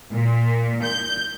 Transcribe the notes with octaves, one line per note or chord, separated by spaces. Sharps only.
A#2
G6